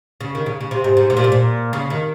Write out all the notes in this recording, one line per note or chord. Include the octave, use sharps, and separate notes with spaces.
C#3
D#3
C#3
C#3
C3
G#2
G#2
C3
A#2
G#2
A#2
C#3
D#3